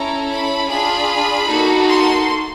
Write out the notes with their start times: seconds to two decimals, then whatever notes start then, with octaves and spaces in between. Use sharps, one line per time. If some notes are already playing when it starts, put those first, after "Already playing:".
Already playing: C#4 E4 A4 A#5
0.30 B5
0.69 D4 F4 G#4 B5
1.48 A#3 D#4 F#4 A4
1.87 C6